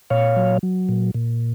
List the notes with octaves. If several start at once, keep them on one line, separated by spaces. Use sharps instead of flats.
A#2 C#5 F5
F#3
F#3
A#2
A#2